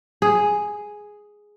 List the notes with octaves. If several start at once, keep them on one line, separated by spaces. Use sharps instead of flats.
G#4